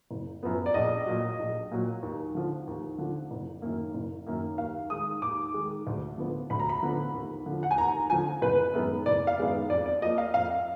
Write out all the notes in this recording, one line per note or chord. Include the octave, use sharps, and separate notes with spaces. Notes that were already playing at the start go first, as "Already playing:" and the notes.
F#1
F#2 F3 B3
D5
A#1 D#5
A#2 F#3
A#1
A#2 F#3
D#2
D3 F3
D#2
D3 F3
F#1
F#2 D#3 A#3
F#1
F#2 D#3 A#3
D#2 F5
D#3 G#3 D#6
D#2 D6
D#3 G#3
D2
D3 F3 B3
D2 B5
A#5
B5
D3 F3 B3
D#2
D3
F3
F#5
G#5
D#2 A#5
D3 F3 G#5
F#1 B4
F#2 D#3 G#3 B3
F#1 D5
F5
F#2 D#3 G#3 B3
F2 D5
D5
F3 A#3 D#5
F5
F2 F5